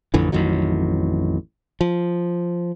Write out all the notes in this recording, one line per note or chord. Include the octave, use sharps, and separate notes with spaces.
A1 F2 D3 E3
A1 F2 D#3 F#3
F3